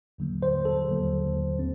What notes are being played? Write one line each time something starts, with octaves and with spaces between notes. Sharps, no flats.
D#2 D3 F#3 A#3
C5
A4
D#2 D3 F#3 A#3
C4